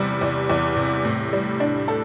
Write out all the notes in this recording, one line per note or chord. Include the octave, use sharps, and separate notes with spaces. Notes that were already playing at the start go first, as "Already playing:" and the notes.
Already playing: E2 C3 G3
E2
E2
C3
A2
G3
D4
A4